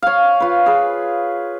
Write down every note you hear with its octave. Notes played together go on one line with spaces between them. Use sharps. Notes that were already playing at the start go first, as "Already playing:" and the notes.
C#5 F5
F4 B4
G#4 B4